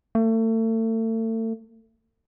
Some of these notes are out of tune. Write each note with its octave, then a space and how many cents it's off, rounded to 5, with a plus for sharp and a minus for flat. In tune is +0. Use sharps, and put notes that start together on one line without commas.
A3 +35